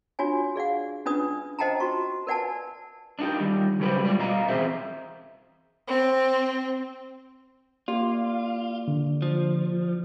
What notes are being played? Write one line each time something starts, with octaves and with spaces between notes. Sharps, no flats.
D4 F4 F#4 C#5 G#5
G#4 D5 F5 F#5
C#4 D4 F4 B4 D5 D#6
C5 D#5 F#5 G5 A5 A#5
F4 F#4 C#6
A#4 B4 D5 F#5 G#5 A5
D4 D#4 F#4 G4
D#3 G3
C#3 F#3 A3 G4 B4 C5
G3 G#3 F4 D5
B2 D#5 F5 A#5
E3 G3 C4 G#4 C5 E5
C4
A#3 F4 G4 D5
D3
F3